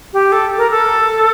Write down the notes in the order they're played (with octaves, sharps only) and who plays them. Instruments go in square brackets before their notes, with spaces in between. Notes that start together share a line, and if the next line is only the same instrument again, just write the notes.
[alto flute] G4
A4
A#4
A4